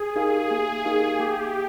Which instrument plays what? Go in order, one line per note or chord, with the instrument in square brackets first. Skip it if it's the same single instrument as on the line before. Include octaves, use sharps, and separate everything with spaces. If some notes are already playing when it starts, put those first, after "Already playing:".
Already playing: [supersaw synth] G#4
[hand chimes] D#4 G4 A#4 F5
A#3
D#4 G4 A#4 F5
[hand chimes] A#3 [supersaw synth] G4